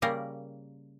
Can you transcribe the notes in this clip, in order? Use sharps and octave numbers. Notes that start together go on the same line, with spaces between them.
C#3 G3 A#3 A#4